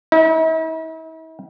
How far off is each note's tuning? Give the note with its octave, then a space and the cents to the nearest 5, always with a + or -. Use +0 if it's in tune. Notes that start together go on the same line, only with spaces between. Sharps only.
E4 -45